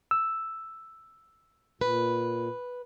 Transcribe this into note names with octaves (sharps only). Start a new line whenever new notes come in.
E6
A#2 B4